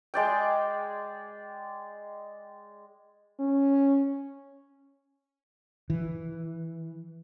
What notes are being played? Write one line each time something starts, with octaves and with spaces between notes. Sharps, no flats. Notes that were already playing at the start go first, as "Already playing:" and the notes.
G#3 D5 G5
C#4
E3